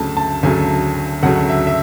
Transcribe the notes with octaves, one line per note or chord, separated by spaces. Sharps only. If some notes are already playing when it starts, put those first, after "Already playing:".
Already playing: D2 C#3 F#3 A3 A5
A5
D2 C#3 F#3 A3 G#5
D2 C#3 F#3 A3 F#5
E5
E5